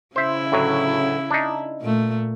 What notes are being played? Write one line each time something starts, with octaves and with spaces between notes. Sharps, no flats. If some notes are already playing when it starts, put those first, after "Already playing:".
C#3 E4 C5 E5
D2 A2 F#3
D4 D#4
A#2 A3